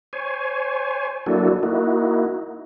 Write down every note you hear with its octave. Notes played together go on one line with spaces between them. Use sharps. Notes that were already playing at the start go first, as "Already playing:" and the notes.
C5 C#5 G#5
F#3 A#3 D4 E4 F#4 A4
A#3 D#4 E4 F#4